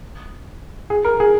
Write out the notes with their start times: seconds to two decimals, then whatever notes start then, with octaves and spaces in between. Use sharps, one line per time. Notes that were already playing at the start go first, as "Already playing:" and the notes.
0.90 G#4
1.05 A#4
1.20 G#4